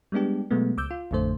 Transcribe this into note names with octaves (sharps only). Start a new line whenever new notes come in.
G3 G#3 B3 D4 G4
B2 F#3 G#3 A3 B3
C#2 D6 E6 G6
F4
A1 F2 D3 A3 C5